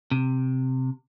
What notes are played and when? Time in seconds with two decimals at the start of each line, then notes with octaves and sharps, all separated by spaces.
0.11 C3